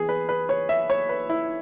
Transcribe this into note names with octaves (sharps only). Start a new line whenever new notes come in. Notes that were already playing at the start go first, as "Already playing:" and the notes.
Already playing: E3 B3 G#4
B4
B4
C#5
E5
C#5
B4
E4